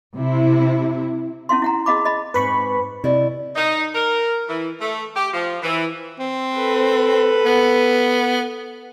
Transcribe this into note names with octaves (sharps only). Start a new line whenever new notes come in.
C3 E4
C#4 E4 F5 C6
E4 F#5 A#5
G#4 D#5 F5 B5 D6
D#5 B5
G#2 C4 B4 B5 C#6
C3 E4 D5 D#5
D#4
A#4
E3
A3
G4
F3
E3
C4
A4 B4
B3